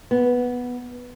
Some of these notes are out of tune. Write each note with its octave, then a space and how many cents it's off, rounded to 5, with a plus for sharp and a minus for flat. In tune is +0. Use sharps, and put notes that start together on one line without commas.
B3 -5